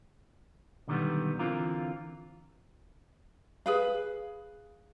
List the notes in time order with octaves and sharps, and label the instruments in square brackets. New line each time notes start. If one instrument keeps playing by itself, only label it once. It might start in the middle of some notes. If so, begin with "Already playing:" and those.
[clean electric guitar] B1 D3 D#3 G3 B3
D3 E3 C4 F4 A#4
[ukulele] G#4 B4 F5